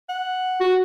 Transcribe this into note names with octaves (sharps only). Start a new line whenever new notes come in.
F#5
F#4